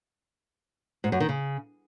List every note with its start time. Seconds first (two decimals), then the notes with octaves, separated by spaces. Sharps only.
1.04 G#2
1.12 F#2
1.20 D#3
1.29 C#3